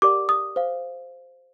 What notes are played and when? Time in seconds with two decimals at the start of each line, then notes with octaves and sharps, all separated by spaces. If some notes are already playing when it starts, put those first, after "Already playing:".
0.02 G4 A#4 D5 F#5 D6
0.29 D#6
0.56 C5 F5